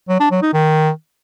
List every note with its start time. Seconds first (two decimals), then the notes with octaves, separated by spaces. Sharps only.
0.09 F#3
0.20 D4
0.31 F#3
0.42 D#4
0.53 D#3